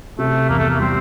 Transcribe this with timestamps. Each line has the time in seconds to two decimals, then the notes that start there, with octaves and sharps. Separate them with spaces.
0.19 C3 A3
0.49 E2 A#3
0.59 A3
0.69 A#3
0.79 G3 C4